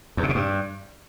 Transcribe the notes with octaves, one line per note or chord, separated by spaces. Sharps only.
E2
C3
B2
G2